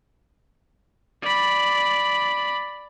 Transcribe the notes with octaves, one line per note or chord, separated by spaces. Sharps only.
D5 B5